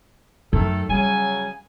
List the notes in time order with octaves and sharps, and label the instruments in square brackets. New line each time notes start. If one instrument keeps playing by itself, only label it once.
[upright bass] F#2 [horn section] D#3 A3 A4
[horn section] C#3 F#3 G#5 [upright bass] G3